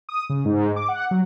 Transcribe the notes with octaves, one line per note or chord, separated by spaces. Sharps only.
D#6
C#3
G#2
D6
F#5
F#3